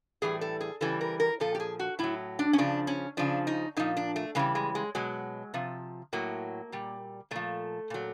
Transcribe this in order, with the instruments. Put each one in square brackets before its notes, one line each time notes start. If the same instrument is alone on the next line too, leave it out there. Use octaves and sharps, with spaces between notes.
[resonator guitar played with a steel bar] A2 E3 G3 G#4
A4
G#4
C#3 E3 G3 A4
A#4
A#4
A#2 F3 A4
G4
G#4
F#4
A2 F#3 E4
D4
C#4
C#3 F3 D4
C#4
C#3 F3 D4
D#4
A#2 F3 D#4
D4
A3
C#3 E3 G3 G#3
G#3
G#3
B2 F#3 G#3
C3 F3
A2 F#3 A#3
A#2 G3
A#2 F3 A3
A#2 F#3